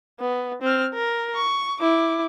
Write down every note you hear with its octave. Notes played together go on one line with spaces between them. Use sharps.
B3
C4 F6
A#4
C#6
E4 D6